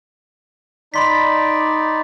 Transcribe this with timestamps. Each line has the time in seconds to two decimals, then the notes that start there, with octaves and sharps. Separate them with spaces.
0.94 D#4 D5 B5 C6 B6